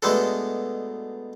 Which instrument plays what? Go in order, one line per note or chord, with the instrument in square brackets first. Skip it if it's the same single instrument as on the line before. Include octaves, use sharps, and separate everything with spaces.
[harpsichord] B2 G#3 A3 B3 D4 A4